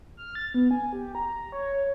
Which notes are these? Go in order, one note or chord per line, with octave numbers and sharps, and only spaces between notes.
F6
A6
B3
G#5
G4
A#5
C#5